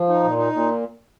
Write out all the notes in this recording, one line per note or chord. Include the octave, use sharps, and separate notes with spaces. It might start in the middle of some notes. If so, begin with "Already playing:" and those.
Already playing: F3
D#4
A#2
D#4
A#2